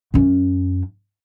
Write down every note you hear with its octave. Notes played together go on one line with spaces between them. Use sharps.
F#2 C#4